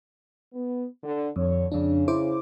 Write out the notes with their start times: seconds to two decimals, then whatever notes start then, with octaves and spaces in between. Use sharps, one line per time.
0.53 B3
1.03 D3
1.36 F2 D3 C#5
1.72 F2 C#3 D4
2.08 E4 C5 D6